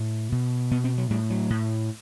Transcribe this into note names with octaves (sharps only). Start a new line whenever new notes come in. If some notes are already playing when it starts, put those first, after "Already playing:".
Already playing: A2
B2
B2 B3
C4
F#3
A2 G3
F#3
A2